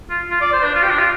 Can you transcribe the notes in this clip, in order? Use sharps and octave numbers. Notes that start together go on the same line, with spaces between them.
F4
F4
D5
C5
D4
F4
G4
D4
F4